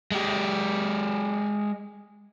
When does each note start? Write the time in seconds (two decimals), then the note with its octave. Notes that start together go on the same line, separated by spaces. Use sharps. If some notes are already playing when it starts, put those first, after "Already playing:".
0.11 G#3 G4